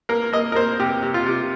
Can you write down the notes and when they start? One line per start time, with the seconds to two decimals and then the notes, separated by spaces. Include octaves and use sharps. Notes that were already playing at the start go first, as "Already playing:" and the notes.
0.09 A#3 A#4
0.33 A#3 D#5
0.52 A#4
0.55 A#3 C5
0.79 C3 G4
1.03 C3
1.14 F4
1.26 C3